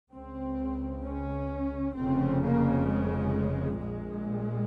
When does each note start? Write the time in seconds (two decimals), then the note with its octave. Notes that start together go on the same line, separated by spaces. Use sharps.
0.11 C#2 C#3 C4
1.03 C#4
1.95 F1 F2 C#3 C4
2.41 A#3
2.87 G#3
3.79 A#1 A#2 G#3